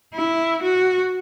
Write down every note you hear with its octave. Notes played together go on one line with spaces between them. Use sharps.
E4
F#4